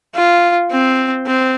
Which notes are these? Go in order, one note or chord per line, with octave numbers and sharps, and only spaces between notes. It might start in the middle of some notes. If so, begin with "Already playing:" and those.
F4
C4
C4